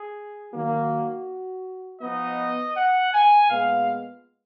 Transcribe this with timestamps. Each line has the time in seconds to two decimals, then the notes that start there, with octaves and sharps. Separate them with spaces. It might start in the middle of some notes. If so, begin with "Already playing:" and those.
Already playing: G#4
0.53 D#3 F#3 A#3 F#4
2.01 F3 B3 D#4 D#5
2.76 F#5
3.13 G#5
3.49 A#2 G#3 B3 F5